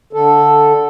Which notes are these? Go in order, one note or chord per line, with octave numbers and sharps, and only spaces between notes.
D3 A4